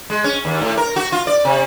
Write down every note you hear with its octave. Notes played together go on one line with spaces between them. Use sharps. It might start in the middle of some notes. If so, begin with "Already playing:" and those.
G#3
C#4
D#2
A2
A#4
F#4
F4
D5
C3